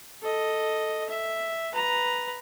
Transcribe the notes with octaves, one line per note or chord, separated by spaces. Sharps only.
A4 D#5
E5
B4 A#5